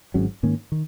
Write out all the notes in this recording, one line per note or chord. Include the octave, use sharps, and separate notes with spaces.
G#1 G#2 F#3 C#4
G#2 D#3 A#3 C#4
D#3